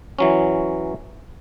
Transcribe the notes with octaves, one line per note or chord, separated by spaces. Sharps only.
E3 F#3 C#4